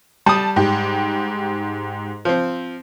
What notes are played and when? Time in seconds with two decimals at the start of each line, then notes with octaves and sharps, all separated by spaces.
0.26 G3 A5 D#6
0.56 G#2 G4
2.25 F3 C4